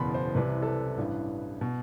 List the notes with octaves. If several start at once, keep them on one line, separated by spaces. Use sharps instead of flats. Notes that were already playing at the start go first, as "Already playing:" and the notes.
Already playing: F#1 E2 B2 B5 C6
C5
C2 C3 E3 B4
A4
B4
A1 G2 E3
B2